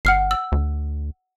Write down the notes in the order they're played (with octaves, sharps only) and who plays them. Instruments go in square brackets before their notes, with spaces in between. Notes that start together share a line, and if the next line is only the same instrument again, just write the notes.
[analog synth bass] G1 [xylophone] F#5 F6 C7
[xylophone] E6
[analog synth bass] D2